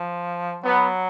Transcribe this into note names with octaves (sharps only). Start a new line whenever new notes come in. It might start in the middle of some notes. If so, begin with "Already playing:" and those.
Already playing: F3
F#3 B3